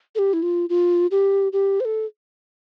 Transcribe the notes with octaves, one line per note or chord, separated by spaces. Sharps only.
A4
G4
E4
F4
F4
G4
G4
C5
A4